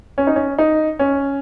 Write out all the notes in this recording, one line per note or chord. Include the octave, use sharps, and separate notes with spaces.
C#4
D#4
C#4
D#4
C#4